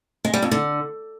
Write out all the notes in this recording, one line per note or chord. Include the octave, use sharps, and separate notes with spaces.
G#3
G3
F2
D3